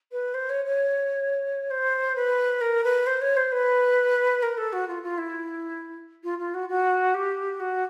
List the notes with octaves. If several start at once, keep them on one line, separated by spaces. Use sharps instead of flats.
B4
C5
C#5
C#5
C5
B4
A#4
B4
C5
C#5
C5
B4
A#4
A4
F#4
F4
F4
E4
F4
F4
F#4
F#4
G4
F#4